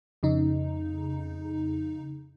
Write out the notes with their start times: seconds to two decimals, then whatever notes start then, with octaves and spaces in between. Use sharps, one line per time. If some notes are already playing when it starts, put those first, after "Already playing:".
0.23 F2 C#3 D#4